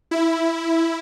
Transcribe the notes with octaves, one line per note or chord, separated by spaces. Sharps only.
E4